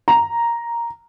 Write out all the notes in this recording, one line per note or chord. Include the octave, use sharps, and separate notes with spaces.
A#5